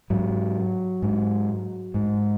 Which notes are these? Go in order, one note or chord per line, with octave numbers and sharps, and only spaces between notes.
G#2 F#3
G#2
G#2